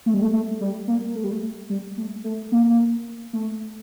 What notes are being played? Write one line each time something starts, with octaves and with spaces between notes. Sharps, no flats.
A3
G3
A3
A3
G3
A#3
A3
G3
A3
A3
G3
A3
A3
A#3
A3